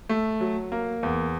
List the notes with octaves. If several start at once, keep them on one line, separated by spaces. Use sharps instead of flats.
A3
F#3
A#3
E2